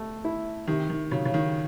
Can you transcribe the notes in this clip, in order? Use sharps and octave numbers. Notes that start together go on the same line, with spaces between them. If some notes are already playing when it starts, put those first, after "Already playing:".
Already playing: A3
E4
C3 D#3
D#3
C#3 F#3
C#3
D#3